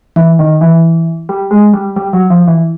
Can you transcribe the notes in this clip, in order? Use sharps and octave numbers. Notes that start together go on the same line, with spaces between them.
E3
D#3
E3
G3
G#3
G3
G3
F#3
F3
E3